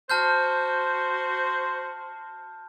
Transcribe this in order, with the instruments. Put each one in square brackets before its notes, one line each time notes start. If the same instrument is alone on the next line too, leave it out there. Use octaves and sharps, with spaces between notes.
[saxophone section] F#4 C5 [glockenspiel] A5 F6 G6